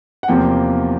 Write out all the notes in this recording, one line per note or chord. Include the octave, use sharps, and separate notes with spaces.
F#5
E2 C3 F3 A#3 G5